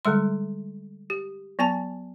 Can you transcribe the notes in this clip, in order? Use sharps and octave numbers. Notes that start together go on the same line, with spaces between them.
D3 G3 G#3 C6
G4
F#3 B3 G#5 A5